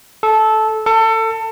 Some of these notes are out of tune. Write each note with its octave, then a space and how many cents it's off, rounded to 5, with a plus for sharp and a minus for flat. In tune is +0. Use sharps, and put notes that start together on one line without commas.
A4 -15
A4 +25